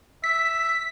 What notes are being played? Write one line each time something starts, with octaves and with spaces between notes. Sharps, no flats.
E5 B6